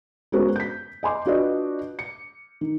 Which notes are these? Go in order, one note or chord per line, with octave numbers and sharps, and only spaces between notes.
G#3 B3 C#4 F#4 A#4 C5
G6 B6
D#5 G#5 C6 D6
D4 F4 F#4 B4 D5 D#5
C#7
D#3